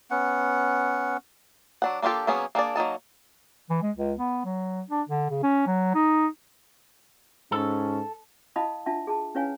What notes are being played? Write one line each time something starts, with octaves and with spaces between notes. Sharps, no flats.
B3 C#4 F#5
F#3 D4 F#5
A#3 D4 F4 G4 A4
F#3 A#3 B3 C#4 G#4
A#3 D4 G#4 D5
F#3 A#3 D#4 A5
E3
G#3
C#2
B3
F#3
D4
D3
C#3
C#4
F#3
D#4
G#2 C#4 A4
E4 D#5 F5 A5 B5 D#6
D4 F4 E5 F#5 A5
G#4 A5
C#4 E4 B4 C#5 F5 G#5